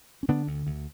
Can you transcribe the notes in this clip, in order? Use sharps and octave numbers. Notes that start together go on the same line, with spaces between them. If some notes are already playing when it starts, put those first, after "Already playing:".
C#4
D3 B3 D4
D2
D2